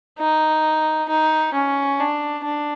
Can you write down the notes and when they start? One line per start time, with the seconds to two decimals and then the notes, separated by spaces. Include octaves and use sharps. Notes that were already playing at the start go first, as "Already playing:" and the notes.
0.19 D#4
1.09 D#4
1.54 C#4
2.00 D4
2.44 D4